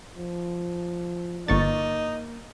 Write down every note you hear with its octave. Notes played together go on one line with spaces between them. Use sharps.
F3
G1 A#3 D#4 C#6 A6